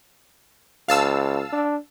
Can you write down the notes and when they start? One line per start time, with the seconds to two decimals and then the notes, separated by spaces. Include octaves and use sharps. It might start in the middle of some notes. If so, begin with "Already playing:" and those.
0.89 C#2 F5 A5 E6
1.52 D4